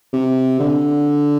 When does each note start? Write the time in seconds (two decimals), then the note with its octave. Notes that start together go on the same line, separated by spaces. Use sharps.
0.13 C3
0.59 D3